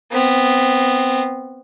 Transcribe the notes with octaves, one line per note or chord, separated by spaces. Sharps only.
B3 C4